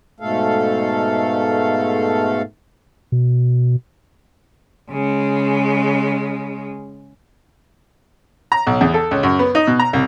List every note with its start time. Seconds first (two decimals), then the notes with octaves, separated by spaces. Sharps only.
0.20 G#2 B2 A3 A4 F5
3.12 B2
4.91 C#3 G#3
8.52 A#5
8.67 B1
8.81 E2
8.94 A4
9.11 C#2
9.23 F#2
9.39 B3
9.55 D#4
9.67 B2
9.79 A#5
9.93 C2